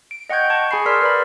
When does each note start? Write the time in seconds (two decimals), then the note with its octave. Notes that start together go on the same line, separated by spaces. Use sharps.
0.11 D7
0.30 D#5 F#5 G5 C#6 G6 G#6
0.50 A5 C#6 G#6
0.71 G#4 G#5 B5 C7
0.86 A#4 D5 C6 E6 F6 B6
1.02 B4 D5 B5